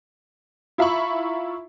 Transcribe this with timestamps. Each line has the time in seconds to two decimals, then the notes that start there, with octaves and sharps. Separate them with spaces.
0.78 E4 F4 E5 A#5 B5 C#6